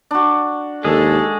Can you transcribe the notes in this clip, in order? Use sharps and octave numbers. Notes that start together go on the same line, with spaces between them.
D4 F#4
D#2 G#3 G#4 A4